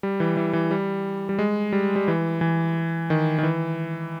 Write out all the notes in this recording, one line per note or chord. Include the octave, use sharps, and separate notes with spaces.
G3
E3
E3
E3
G3
G3
G#3
G3
G3
E3
E3
D#3
D#3
E3